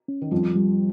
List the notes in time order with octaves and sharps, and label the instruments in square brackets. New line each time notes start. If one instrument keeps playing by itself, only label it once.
[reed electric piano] C#4
[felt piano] D#3
[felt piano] F2 F3 [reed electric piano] G3
[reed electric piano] G3